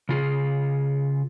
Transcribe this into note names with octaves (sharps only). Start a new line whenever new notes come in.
C#3 F4 G#4